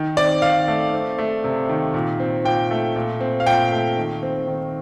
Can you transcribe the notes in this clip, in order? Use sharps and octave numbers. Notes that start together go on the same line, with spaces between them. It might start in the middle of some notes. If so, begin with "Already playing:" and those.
Already playing: D#3
C4 D5
D#3 F5
A3
C4
A3
C3
D#3
A#2
C4
A#2 G5
A3
A#2
C4
F5
A#2 G5
A3
D#3
C4
D#3